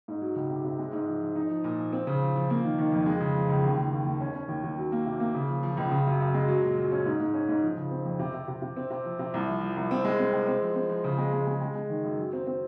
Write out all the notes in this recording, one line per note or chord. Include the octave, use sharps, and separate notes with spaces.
G#2
F#3
C#2
C3
C3
G#3
G#2
F3
F3
D#4
F3
A#2
F3
C4
C#3
F3
F3
A#3
D#3
D#3
F2
G#3
C#3
F3
C#2
D#2
D#2
D#2
D#2
C#4
C#4
D#2
D#2
F#3
A#3
C3
A#3
C#3
F3
F3
C#2
C#3
F#2
F#2
G#3
F#3
A#2
F#3
C#4
G#2
G#2
C#4
G#2
F3
C#3
C4
F2
C3
C3
C3
C3
C4
C3
F3
C3
C2
F3
F3
C2
C4
G#3
C4
G#3
C4
F3
C4
F3
C#3
G#3
G#3
G#3
G#3
G#3
D#3
F#2
F#3
C4
C4